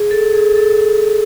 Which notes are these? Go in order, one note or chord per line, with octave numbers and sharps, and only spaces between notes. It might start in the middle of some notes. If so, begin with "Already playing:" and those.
Already playing: G#4
A4
G#4
A4